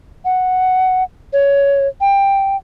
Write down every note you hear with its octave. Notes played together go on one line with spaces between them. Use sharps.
F#5
C#5
G5